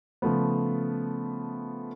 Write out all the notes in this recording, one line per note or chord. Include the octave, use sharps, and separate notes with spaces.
C#3 F3 A3 B3